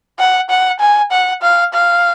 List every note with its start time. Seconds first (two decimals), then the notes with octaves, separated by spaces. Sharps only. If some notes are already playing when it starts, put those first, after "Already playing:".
0.19 F#5
0.50 F#5
0.80 G#5
1.11 F#5
1.42 F5
1.73 F5